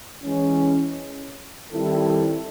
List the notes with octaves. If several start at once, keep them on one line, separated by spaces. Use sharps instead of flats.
E3 G#3 C#4
D#3 G3 C4 E4 A4